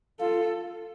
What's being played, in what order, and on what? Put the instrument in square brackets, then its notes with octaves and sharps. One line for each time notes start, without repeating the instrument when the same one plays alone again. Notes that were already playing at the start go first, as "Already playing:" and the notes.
[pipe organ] F4 [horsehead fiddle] A4